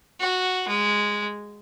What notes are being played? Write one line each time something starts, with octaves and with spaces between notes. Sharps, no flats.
F#4
G#3